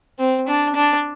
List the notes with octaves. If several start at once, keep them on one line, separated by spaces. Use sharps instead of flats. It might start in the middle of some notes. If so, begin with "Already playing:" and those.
C4
D4
D4